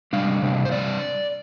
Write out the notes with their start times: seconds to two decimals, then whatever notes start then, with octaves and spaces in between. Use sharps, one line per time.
0.13 C3 G3 D4 F5
0.42 C3 G3 D4
0.65 C5
0.71 C3 G3 D4 D5